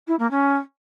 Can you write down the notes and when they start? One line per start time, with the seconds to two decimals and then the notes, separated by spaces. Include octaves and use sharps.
0.07 E4
0.19 A#3
0.30 C#4